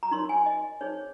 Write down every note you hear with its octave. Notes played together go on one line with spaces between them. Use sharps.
A#5
D#4 A#4 C#5 C6
G#5
D#5
D#4 G#4 C5 C#5